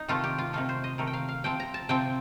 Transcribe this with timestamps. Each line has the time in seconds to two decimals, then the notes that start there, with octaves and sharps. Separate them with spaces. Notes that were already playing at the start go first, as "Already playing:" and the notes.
Already playing: D#4
0.08 C3 D#3 A3 F4
0.24 G4
0.38 F4
0.53 C3 D#3 A3 F4
0.69 C5
0.84 D#5
0.98 C3 D#3 A3 A#4
1.07 G5
1.14 F5
1.29 F5
1.44 C3 F3 C4 G5
1.60 A#5
1.74 A5
1.89 C3 F3 C4 G5